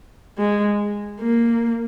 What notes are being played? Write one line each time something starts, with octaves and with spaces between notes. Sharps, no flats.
G#3
A#3